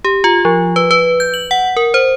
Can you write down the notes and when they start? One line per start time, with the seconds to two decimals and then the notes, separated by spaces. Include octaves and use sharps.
0.05 G4
0.24 F4
0.45 F3
0.76 B4
0.91 B4
1.20 G6
1.34 F#7
1.51 F#5
1.77 A#4
1.94 C5